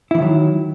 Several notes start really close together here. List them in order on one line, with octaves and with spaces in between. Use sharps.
E4 E3 D#3 F#3